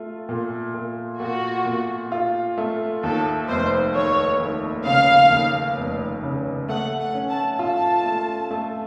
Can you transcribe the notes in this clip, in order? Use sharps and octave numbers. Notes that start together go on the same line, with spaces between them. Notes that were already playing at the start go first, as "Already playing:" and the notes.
Already playing: A3 F4
A#2
A#2
A#2 F#4
A#2
F4
A3
D#2 A4
F1 C5
D#2 C#5
D#2
C#3 F5
D#2
F1
C#3
A3 F#5
F#5
C#4
A5
F4 A5
A3
A3